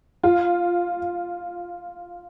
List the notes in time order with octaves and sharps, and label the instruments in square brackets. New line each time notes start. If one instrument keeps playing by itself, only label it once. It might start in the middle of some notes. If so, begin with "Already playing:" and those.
[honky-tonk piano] F4